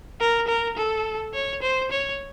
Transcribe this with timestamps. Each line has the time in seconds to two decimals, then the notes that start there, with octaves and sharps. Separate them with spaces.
0.20 A#4
0.48 A#4
0.77 A4
1.34 C#5
1.62 C5
1.92 C#5